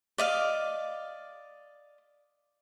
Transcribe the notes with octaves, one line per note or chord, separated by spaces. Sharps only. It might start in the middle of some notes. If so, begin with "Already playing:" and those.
D5 D#5 F5